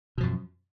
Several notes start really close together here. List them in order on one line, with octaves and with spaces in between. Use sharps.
B2 F3 F#2